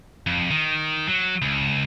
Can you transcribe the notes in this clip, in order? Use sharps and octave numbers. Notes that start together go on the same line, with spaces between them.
F2
D#3
F#3
C#2